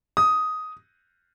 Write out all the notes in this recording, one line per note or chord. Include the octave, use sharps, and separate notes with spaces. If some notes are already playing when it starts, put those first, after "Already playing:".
D#6